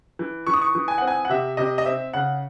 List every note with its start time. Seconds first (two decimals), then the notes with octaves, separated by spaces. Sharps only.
0.19 E3
0.47 E3 C#6
0.54 D#6
0.62 C#6
0.75 E3
0.88 G#5
0.98 C4 F#5
1.07 G#5
1.25 F#5
1.29 C3 E5
1.57 C3 D#5
1.78 D#5
1.85 C4 E5
2.13 C#3 F#5